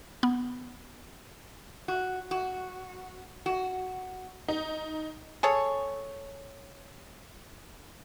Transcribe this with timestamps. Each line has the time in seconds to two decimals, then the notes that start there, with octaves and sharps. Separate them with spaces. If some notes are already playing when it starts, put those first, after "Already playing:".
0.23 B3
1.88 F#4
2.31 F#4
3.46 F#4
4.48 D#4
5.43 G#4 A4 C#5